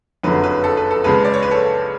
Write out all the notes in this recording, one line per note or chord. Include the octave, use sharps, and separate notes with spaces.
F#1 F2 D3 F#3 B4
B4
A4
B4
A4
C#2 C#3 G#3 B4
D5
C#5
B4
A4 C#5